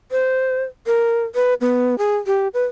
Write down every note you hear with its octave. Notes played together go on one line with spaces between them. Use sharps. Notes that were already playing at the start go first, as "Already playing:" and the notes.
C5
A#4
B4
B3
G#4
G4
B4